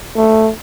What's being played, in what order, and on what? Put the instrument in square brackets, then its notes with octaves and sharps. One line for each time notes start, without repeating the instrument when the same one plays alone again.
[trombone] A3